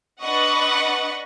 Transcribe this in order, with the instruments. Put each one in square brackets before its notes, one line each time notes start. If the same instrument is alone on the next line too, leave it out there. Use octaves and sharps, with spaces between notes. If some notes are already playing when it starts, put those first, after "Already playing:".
[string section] D4 B4 D#5 F#5 C#6